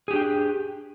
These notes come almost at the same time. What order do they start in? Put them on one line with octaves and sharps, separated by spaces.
G#4 G4 D4 G5